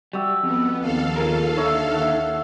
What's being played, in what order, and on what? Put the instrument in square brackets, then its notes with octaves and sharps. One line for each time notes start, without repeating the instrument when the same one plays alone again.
[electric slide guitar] G3 [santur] F#4 G4 E6
[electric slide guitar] F2 [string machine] B3
[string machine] D#2 A4 F5
[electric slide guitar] F4 G#4 A#4
[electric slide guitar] D3 D#4 [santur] C#5 E5
[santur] E5 F#5